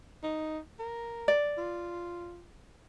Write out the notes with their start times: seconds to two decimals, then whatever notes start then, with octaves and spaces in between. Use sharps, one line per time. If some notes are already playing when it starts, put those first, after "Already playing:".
0.23 D#4
0.79 A#4
1.28 D5
1.58 F4